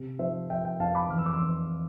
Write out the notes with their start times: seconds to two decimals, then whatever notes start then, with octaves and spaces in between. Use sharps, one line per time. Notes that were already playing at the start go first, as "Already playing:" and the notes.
Already playing: C3
0.19 F3 C5 E5
0.50 F3 E5 G5
0.65 E5 G5
0.79 F2 F5 A5
0.95 B5 D6
1.10 E2 F6
1.18 E6
1.26 D6
1.33 C6 E6
1.40 E2